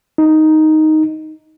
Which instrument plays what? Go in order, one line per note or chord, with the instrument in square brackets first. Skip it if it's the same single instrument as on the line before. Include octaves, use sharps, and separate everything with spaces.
[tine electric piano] D#4